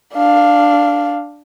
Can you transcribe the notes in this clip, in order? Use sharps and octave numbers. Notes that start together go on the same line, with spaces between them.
D4 F5